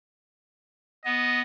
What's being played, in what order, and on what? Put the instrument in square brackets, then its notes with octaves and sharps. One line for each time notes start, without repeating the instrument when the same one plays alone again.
[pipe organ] B3 [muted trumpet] D#5